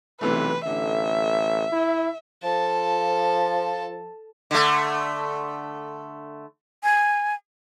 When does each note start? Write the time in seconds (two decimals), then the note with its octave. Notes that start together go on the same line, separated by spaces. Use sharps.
0.21 B1 C3 E3 A3 B4
0.66 A1 D3 E5
1.72 E4
2.43 F3 A4 A5
4.51 D3 A3
6.83 G#5